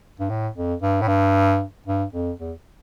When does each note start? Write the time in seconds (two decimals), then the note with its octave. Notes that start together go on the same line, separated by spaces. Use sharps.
0.20 G2
0.30 A2
0.56 F2
0.82 G2
1.02 A2
1.08 G2
1.86 G2
2.13 F2
2.40 E2